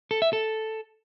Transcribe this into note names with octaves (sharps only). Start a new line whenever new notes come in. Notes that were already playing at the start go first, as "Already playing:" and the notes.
A4
E5
A4